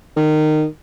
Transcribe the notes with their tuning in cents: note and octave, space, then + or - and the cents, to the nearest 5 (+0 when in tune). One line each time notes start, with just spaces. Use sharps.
D#3 -20